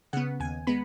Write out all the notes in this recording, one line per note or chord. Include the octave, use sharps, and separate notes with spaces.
C#3 B3 F#5
D#2 G#5
G#3 B3 B5